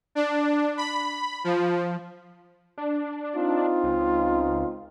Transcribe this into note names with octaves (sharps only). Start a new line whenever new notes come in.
D4
B5
F3
D4
C4 D#4 F4
C#2